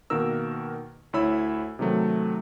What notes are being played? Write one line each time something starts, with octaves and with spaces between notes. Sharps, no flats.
B2 D#3 A#3 A#4 E6
D2 E4 C#5 B5 E6
C3 D#3 F#3 A3